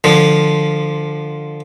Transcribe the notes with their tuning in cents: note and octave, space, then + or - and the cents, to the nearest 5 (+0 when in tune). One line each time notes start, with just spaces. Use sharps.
D3 +20 F3 +0